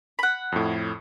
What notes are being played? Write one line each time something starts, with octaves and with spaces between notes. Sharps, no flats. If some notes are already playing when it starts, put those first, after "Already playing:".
F#5 B5
F2 A2